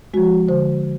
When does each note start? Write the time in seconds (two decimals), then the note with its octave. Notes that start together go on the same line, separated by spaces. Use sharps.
0.14 F3 G#3 F#4
0.48 D3 C5